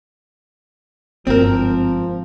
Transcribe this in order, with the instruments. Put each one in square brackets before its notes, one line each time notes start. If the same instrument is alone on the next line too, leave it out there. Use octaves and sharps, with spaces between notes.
[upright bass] G1 G#2 [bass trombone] F3 [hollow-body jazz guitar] C4 A#4